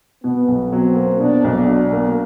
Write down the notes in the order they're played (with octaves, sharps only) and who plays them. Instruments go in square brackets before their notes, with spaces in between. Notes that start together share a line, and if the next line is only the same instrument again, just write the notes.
[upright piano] B2 [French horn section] B3
[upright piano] B1
[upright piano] F#3 [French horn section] C4
[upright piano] A#3
[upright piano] B2 [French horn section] D4
[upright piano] B1
[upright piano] F#3 [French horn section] D4
[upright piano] A#3